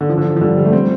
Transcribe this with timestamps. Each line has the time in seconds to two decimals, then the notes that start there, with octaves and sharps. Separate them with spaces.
0.01 D3
0.09 F3
0.18 D3
0.25 F3
0.36 F3
0.41 D3 G3
0.57 G3
0.65 A3
0.73 G3 C4